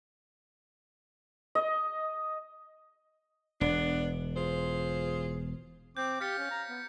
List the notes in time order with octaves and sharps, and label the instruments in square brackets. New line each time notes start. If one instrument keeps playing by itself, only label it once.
[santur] D#5
[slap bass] E1 [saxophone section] B3 D4
[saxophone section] F4 G#4 C5
[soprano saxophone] C4 [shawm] D6 [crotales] G6
[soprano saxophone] G4 [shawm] F5 [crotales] A6 B6 C#7
[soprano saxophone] C#4
A#5
B3